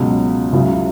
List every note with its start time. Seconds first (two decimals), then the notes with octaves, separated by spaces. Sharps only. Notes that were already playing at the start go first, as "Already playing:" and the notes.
Already playing: C#2 B2 F#3 C#4
0.53 C#2 C#3 F#3 C#4 E4